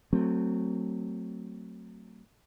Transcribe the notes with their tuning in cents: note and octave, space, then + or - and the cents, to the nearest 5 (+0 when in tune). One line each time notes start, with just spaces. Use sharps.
F#3 +0 A3 +25 C4 +5